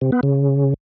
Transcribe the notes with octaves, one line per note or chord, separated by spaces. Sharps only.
C3
B3
C#3